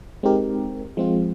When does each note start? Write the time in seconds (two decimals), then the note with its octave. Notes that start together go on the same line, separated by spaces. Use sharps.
0.23 G#3 C4 D#4 G4 A#4
0.97 F3 G#3 C4 F4